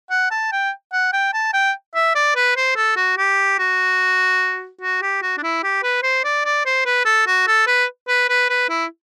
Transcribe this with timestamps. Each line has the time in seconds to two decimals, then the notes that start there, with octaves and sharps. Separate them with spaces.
0.11 F#5
0.31 A5
0.52 G5
0.93 F#5
1.13 G5
1.33 A5
1.53 G5
1.95 E5
2.15 D5
2.35 B4
2.56 C5
2.76 A4
2.96 F#4
3.17 G4
3.59 F#4
4.81 F#4
5.02 G4
5.22 F#4
5.37 D4
5.43 E4
5.63 G4
5.83 B4
6.03 C5
6.24 D5
6.45 D5
6.65 C5
6.85 B4
7.05 A4
7.27 F#4
7.47 A4
7.67 B4
8.08 B4
8.29 B4
8.49 B4
8.69 E4